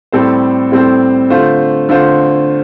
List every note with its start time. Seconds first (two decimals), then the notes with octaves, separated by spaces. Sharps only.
0.12 A2 G3 C4 A4 C5
0.71 A2 G3 C4 A4 C5
1.30 D3 A3 F4 C5
1.89 D3 A3 F4 C5